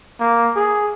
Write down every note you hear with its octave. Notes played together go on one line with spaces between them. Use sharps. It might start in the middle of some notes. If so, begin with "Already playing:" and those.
A#3
G#4